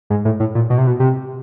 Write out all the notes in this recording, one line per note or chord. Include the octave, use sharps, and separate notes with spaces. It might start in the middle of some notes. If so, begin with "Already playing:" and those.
G#2
A2
A2
A#2
B2
C3
B2
C3